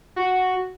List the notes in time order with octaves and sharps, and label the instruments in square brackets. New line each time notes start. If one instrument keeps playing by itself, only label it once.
[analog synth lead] F#4